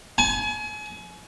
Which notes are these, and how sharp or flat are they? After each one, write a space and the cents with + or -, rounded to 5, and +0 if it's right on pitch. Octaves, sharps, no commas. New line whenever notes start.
G#5 +35